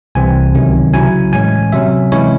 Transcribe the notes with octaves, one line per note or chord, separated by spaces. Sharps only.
C2 C3 E3 C4 G#5
C#2 C3 D#3 F#3 C#4
C#3 F#3 C#4 E4 G#5
A2 E3 G#3 C#4 G#5
C3 F#3 C#4 E5
C3 E3 G#3 C#4 E4 C#5